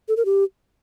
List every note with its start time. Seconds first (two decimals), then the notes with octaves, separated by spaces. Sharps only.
0.08 A4
0.17 A#4
0.25 G4